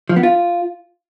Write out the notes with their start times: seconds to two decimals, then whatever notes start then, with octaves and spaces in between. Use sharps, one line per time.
0.09 F3
0.16 B3
0.23 F4